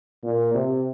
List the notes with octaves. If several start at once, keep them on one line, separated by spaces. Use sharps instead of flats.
A#2
C3